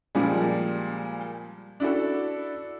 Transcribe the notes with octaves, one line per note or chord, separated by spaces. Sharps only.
A#2 F3 G3 G#3
D4 E4 F#4 A4